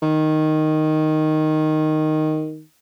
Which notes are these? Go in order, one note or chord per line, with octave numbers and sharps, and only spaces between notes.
D#3